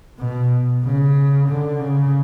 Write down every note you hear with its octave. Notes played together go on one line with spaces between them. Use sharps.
B2
C#3
D3
C#3